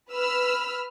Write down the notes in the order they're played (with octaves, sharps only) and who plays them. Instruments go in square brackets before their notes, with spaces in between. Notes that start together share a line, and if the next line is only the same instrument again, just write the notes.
[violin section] B4 B5 E6 F6